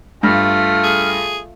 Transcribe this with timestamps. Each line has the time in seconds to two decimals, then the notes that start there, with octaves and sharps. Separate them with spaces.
0.23 G2 A3 F4 F6
0.84 G#4